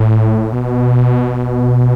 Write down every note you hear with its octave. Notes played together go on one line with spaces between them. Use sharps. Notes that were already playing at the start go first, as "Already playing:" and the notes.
Already playing: A2
B2